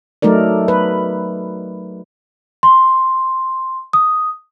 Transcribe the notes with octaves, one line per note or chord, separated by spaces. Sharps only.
F#3 A3 D#4 A#4 D5
B4
C6
D#6